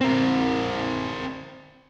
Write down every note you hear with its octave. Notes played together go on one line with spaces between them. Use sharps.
C4 A#4